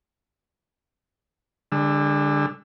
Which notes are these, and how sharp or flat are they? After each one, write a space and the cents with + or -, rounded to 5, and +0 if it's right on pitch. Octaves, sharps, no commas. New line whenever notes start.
D3 +0 G#3 -45 E6 +0